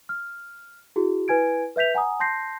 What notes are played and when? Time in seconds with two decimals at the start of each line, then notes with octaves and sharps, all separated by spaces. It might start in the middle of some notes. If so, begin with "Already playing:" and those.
0.09 F6
0.96 E4 F#4 G#4
1.28 E4 B4 G#5 G#6 D7
1.76 B4 E5 G6 B6 F7
1.95 F#5 G#5 A#5 D#6
2.20 A5 C6 G6 A#6 C7